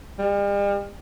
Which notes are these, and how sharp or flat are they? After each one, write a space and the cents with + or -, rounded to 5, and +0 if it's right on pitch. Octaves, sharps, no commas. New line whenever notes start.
G3 +45